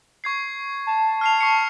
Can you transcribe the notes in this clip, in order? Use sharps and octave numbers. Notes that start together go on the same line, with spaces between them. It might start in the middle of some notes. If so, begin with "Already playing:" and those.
C#6 G#6 C7
A5
F6 C7 F7
C#6 C7 C#7